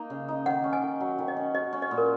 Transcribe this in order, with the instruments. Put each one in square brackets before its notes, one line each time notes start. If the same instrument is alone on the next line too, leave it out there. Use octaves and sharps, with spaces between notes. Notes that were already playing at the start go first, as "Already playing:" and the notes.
Already playing: [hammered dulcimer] A#3 D#4
C#3
D#4
[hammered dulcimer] D#3 [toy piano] F#5
[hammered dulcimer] C#4
[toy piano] G#5
[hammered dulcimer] D#3
F#3
D#3
[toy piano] D#5
[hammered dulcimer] C#4
[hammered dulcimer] F#4 [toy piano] D#5
[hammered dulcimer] C#4
[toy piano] D#5
[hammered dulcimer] A#2
[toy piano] A#4